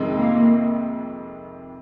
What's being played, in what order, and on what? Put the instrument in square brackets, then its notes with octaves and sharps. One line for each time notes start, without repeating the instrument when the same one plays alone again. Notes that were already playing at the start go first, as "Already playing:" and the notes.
Already playing: [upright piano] F2 C3 D#3 G#3
[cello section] A#3